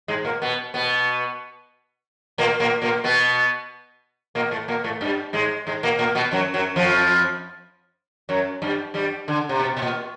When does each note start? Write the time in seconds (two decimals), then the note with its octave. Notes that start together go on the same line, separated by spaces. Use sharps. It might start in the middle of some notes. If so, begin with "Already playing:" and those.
0.08 G#2 G#3
0.25 A#2 A#3
0.42 B2 B3
0.74 B2 B3
2.38 A#2 A#3
2.60 A#2 A#3
2.82 A#2 A#3
3.04 B2 B3
4.35 A#2 A#3
4.51 A2 A3
4.68 A#2 A#3
4.84 A2 A3
5.01 G2 G3
5.33 G#2 G#3
5.67 G#2 G#3
5.83 A#2 A#3
5.99 A#2 A#3
6.15 B2 B3
6.31 F#2 F#3
6.54 F#2 F#3
6.76 F2 F3
8.29 F#2 F#3
8.62 G2 G3
8.94 G2 G3
9.28 D3
9.49 C3
9.60 B2
9.77 B2
9.82 A#2